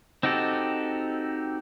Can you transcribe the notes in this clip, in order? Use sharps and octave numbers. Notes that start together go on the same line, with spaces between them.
C4 D#4 F#4 G4 A4